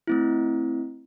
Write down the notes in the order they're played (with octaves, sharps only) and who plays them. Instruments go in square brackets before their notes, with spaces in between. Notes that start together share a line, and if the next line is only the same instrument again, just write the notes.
[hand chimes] A3 C4 E4